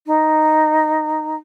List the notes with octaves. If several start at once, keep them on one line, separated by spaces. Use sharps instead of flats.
D#4